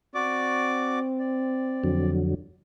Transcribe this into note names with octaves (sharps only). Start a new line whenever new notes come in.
C4 F#4 D5 D6
D5
F2 D3 F#3